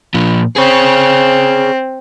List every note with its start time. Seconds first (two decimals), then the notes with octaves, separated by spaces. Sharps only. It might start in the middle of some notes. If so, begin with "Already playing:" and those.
0.14 A#2 F3
0.56 C4 G#4 C#5